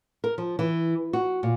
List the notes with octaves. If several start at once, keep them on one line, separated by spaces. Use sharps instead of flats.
A#4
F3
E3
F#4
A#2